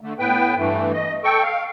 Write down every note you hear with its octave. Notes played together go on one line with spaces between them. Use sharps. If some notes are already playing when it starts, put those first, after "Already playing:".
D3 A3
A2 B3 B4 G5
G2 E3 A3
D#5
A4 G5 C#6
F5